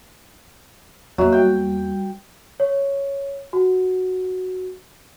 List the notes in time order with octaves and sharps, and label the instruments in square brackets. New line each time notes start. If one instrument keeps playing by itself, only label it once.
[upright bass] E2 A#3 [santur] F#3 [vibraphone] D#5 E5
[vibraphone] G3 [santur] G5
[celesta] C#5
F#4